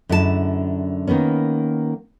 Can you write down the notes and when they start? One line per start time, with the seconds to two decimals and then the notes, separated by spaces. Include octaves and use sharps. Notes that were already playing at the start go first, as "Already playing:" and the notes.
0.09 F#2 D3 G#3 E4 G4 A5
1.07 D#3 A#3 B3 C#4